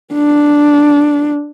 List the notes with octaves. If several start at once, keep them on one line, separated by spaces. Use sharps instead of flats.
D4